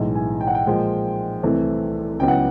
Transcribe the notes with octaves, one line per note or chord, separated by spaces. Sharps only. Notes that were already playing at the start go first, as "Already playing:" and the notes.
Already playing: B1 A2 E3 G#3
G#5
G5
F#5
G5
A#2 F3 G#3
C2 C3 E3 A3 C4
C#2 C#3 F#3 B3 E4 G5
F#5